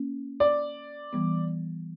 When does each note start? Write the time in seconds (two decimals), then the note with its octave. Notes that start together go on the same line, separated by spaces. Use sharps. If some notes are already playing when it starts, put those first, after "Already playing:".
Already playing: A#3 C#4
0.40 D5
1.13 E3 G3 B3